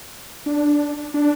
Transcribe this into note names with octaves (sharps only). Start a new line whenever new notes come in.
D4
D4